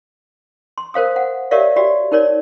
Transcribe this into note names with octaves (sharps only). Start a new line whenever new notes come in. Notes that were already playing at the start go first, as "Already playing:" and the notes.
C6
A#4 C5 F5 D#6
F#5
G4 A#4 C#5 D5 E5 F5
F#4 G4 D5
D#4 A#4 C#5 D5